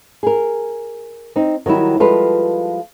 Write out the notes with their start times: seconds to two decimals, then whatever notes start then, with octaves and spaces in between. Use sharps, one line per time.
0.23 G#4 A#4
1.36 C4 D#4
1.66 D#3 F#3 G3 E4
2.00 F3 G3 G#3 F4 A4 B4